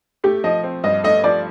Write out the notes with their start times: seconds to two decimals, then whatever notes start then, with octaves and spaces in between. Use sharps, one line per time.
0.24 A3 G4
0.44 F3 D#5
0.64 C4
0.84 G2 D#5
1.04 A3 D#5
1.24 F3 D5